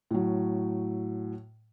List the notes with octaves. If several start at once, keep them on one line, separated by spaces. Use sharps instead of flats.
A2 F#3